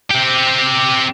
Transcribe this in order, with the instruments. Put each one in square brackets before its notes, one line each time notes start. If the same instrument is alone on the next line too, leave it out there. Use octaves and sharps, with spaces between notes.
[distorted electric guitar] C4 G4